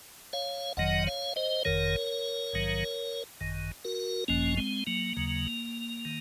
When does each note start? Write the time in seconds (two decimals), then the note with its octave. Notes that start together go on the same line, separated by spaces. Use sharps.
0.33 C#5 F5
0.77 F#1 F2 D#3 F#3 D#5 F#5
1.07 C#5 F5
1.36 C5 D#5
1.65 F#1 F2 D#3 A#4 C#5
2.53 A#1 G#2 D#3 F#3
3.41 G#1 F#2 D#3
3.85 F#4 A#4
4.28 G#1 F#2 F3 A#3 C#4
4.57 G#3 C4
4.87 F#3 A#3
5.17 D#2 C#3 F#3
6.05 D#3